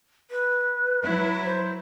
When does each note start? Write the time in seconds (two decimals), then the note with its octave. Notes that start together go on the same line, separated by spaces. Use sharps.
0.30 B4
1.05 F#3 E4
1.45 C5